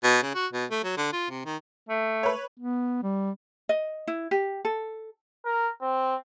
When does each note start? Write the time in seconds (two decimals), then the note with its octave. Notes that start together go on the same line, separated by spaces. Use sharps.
0.04 B2
0.22 C#3
0.35 F#4
0.53 B2
0.71 A3
0.84 F#3
0.97 D3
1.13 F4
1.30 C3
1.46 D#3
1.89 A3
2.23 B4 C#5
2.59 B3
3.03 G3
3.69 D#5
4.07 E4
4.31 G4
4.65 A4
5.45 A#4
5.82 C4